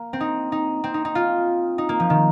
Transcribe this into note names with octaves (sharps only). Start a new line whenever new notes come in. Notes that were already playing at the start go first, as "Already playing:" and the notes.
Already playing: A#3
C4
D#4
D#4
C4
D#4
D#4
F4
D#4
A#3
F3
D#3